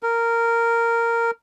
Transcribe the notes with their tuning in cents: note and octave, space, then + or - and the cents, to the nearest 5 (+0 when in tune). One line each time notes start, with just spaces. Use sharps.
A#4 -10